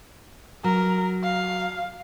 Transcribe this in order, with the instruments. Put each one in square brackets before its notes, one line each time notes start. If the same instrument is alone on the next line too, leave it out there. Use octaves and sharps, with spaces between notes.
[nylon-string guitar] F#3 [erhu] A#4
[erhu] F5